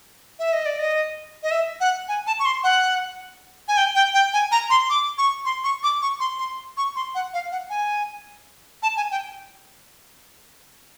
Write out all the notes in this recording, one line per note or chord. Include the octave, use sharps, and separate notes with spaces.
E5
D#5
D5
D#5
D#5
E5
F#5
G#5
A5
C#6
C6
F#5
G#5
G5
G5
G5
G#5
A#5
C6
D6
C#6
C6
C#6
D6
C#6
C6
C6
C#6
C6
F#5
F5
F#5
G#5
A5
G#5
G5